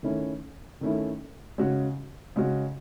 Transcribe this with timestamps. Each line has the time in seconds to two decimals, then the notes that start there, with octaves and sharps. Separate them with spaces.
0.03 D#3 A3 C#4 E4
0.81 D#3 A3 C#4 E4
1.58 C#3 G#3 C#4 F#4
2.36 C#3 G#3 C#4 F#4